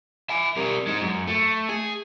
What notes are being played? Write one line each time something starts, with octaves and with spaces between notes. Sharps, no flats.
E5 G#5
G3 A#4
G#3 D#4
F#2
A3
G#4